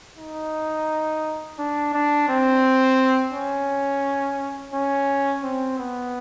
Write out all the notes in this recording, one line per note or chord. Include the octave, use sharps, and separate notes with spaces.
D#4
D4
D4
C4
C#4
C#4
C4
B3